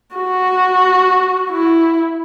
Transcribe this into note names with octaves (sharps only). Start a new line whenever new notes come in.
F#4
E4